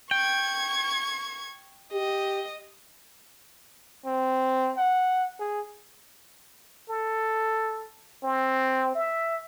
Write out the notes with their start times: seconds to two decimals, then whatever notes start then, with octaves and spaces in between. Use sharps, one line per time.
0.11 G5 C#6 G#6
1.93 G4 D#5
4.06 C4
4.77 F#5
5.40 G#4
6.89 A4
8.23 C4
8.95 E5